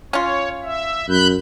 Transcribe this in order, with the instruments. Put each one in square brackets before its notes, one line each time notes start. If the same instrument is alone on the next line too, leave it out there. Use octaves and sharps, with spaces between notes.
[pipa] C#4 F4 [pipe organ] C#5
[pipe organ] E5
[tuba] F#2 [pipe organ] B5 F#6 G6